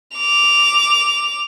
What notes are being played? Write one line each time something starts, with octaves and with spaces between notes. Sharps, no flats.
D6 F7